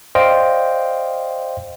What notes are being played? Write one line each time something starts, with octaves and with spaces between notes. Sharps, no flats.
C5 D5 D#5 F5 G5 C6